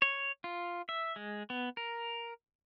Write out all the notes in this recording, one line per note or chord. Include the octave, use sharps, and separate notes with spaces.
C#5
F4
E5
G#3
B3
A#4